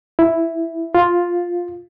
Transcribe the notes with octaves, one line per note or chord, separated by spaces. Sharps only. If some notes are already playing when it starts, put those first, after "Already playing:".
E4
F4